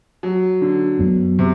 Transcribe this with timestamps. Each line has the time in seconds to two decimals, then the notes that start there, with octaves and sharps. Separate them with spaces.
0.23 F#3
0.62 D3
0.99 F#2 F#3 B3
1.39 C3